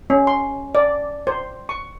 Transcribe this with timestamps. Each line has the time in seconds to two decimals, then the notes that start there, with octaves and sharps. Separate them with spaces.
0.10 C#4
0.27 C6
0.75 D5
1.27 C5
1.69 C#6